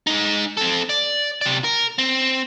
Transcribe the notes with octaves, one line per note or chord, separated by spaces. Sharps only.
G#3 D#4
C4 A4
D5
C3 D5
A#4
C4